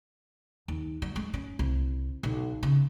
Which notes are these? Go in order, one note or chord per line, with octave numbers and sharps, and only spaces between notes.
D#2
F#3
G#3
C#4
C2
B1
C#3